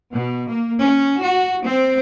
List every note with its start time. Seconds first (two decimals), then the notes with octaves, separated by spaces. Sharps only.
0.12 B2
0.47 A#3
0.83 C#4
1.21 F#4
1.66 C4